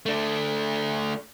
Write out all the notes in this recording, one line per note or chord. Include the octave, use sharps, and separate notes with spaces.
A3 D4